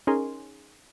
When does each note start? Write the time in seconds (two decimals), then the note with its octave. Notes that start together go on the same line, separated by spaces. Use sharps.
0.07 C#4 D#4 G#4 A#4 G#5 C6